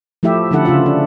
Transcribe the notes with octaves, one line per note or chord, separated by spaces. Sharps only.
F3 A3 E4 G4 E5
D3 F3 C#4 E4 A4 F#5
C#3 F4 E5
D4